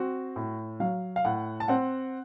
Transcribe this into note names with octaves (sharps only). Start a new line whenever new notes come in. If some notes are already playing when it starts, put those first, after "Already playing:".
Already playing: C4 F#4
A2
F#3 F5
F5
A2 F#5
A5
C4 F#5